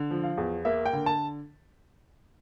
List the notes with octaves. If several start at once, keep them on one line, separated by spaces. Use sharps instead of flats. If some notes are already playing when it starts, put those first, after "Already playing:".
Already playing: D3
F3
F5
E2
A#3 E5
G5
D3
A5